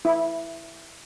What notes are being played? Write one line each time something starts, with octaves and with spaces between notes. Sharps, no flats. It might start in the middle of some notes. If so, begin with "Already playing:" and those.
E4